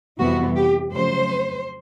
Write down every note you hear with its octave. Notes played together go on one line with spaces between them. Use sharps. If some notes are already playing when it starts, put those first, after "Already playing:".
F2 C3 E3 G3 B3 F#4
G4
F2 C#3 F#3 A3 C5